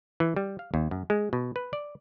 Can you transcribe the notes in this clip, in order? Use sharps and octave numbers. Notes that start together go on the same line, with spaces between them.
E3
G3
F5
D#2
F#2
G#3
B2
B4
D5